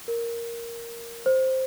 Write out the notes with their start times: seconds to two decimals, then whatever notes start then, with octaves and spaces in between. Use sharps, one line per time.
0.08 A#4
1.26 C5